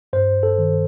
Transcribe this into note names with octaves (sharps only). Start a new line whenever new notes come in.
G2 C5
A4
D#3